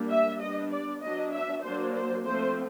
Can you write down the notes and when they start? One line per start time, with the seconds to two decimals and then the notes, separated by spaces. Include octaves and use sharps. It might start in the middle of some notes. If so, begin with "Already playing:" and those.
Already playing: G3 A#3 D4
0.10 E5
0.40 G3 B3 D4 D#5
0.71 D5
1.02 F#3 B3 D4 D#5
1.33 E5
1.63 F#3 A#3 D4 C5
1.94 C5
2.24 F3 A3 C4 C5